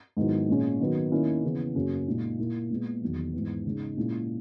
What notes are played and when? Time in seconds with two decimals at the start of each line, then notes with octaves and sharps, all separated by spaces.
0.17 G#2 D#3 F#3 B3 E4
0.48 A#2 G#3 C#4
0.80 D#3 F#3 B3
1.12 D#3 A#3 C#4 E4
1.43 C#3 E3 B3
1.75 F#2 C#3 F#3 A#3 C#4
2.07 A#2 G#3 D#4
2.38 A#2 A#3 E4
2.70 A#2 G#3 B3
3.01 E2 D#3 F#3
3.33 G#2 E3 B3
3.65 C#3 G#3 D#4
3.97 A#2 G#3 C#4 E4